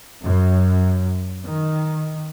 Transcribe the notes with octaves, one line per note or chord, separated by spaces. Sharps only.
F#2
D#3